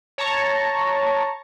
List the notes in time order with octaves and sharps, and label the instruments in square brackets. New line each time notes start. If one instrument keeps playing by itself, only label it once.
[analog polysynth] C#5 A5 A#5 C#6